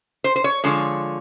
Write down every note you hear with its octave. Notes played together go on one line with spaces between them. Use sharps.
C5
C5
C#5
D3 F3 G#3 C#5